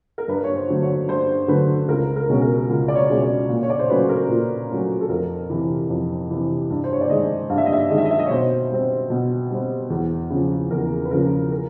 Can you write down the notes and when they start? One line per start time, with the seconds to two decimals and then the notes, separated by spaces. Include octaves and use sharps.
0.18 A#4
0.28 G2 B4
0.44 C#5
0.55 C5
0.69 D3 F#3 A3
0.82 C#5
1.08 G2 C5
1.48 D3 F#3 A3 B4
1.88 C#2 A#4
2.16 A#4
2.29 B2 G#3 C#4
2.42 A#4
2.69 C#2
2.88 D5
2.95 C#5
3.09 B2 G#3 C#4
3.22 D5
3.49 A#2
3.63 C#5
3.70 D5
3.79 C5
3.89 F#3 A3 C#4 B4
4.09 A#4
4.29 A#2
4.69 F#3 A3 C#4
5.01 A4
5.09 F2 A#4
5.50 C3 E3
5.89 F2
6.30 C3 E3
6.70 G2
6.84 C5
6.92 C#5
7.01 D5
7.09 D#3 G#3 D#5
7.50 G2 F5
7.58 E5
7.66 D#5
7.73 E5
7.90 D#3 G#3 D#5
7.98 E5
8.05 D#5
8.11 E5
8.19 D#5
8.26 C#5
8.30 B2 C5
8.71 G3 C4
9.10 B2
9.51 G3 C4
9.90 E2
10.30 C#3 F3
10.71 E2 A#4
11.05 B4
11.11 C#3 F3 A#4
11.52 A#4